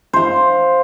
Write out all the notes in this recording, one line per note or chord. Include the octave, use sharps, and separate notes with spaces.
C5 F5